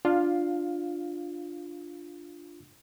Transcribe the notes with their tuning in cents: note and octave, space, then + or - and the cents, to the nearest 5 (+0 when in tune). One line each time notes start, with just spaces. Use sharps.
D4 +10 F4 +0 F5 +15